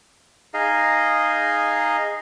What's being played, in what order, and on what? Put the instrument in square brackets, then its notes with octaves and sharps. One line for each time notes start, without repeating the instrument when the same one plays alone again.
[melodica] D#4 G#4 D#5 F5